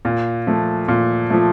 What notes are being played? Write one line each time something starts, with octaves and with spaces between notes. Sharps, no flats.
A#2
F3 A3
A#2
F3 A3